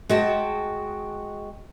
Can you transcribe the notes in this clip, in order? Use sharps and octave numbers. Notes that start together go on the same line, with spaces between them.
G#3 F#4 G5 A5